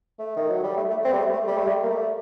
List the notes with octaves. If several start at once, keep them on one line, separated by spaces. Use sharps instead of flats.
A3
D#3
F#3
G3
A3
A3
C4
G3
A3
A3
G3
A3
G3
A#3
A3